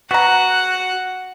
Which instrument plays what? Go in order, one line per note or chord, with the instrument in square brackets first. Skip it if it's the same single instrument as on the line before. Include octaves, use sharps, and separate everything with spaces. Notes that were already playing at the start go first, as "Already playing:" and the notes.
[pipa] B3 A#5 [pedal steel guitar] F#4 [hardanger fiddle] F#5